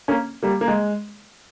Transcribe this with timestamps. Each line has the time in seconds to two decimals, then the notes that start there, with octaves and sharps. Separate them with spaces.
0.08 A#3 C#4
0.43 G3 A#3
0.61 A#3
0.68 G#3